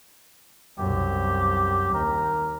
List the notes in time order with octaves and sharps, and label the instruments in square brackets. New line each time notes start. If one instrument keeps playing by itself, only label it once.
[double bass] C2 F#2 [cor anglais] G4
[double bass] D#2 [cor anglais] A#4